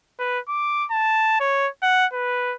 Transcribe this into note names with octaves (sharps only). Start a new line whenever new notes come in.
B4
D6
A5
C#5
F#5
B4